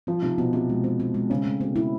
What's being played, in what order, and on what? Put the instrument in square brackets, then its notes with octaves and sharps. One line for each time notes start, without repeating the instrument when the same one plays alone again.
[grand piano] F3 [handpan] C4
[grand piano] C3 [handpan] D#4
[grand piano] B2 [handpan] C4
[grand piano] C3 [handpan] C4
[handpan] G#3
C4
C4
G#3
[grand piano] C#3 [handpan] C4
[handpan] A3
[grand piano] B2 [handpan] C4
[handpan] E4